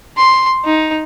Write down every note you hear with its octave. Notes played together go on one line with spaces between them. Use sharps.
C6
D#4